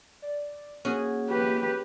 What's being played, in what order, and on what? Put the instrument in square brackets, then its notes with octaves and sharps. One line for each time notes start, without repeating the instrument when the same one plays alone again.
[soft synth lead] D5
[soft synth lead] A#3 [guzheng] C#4 F#4 G#4
[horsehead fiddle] G4 B4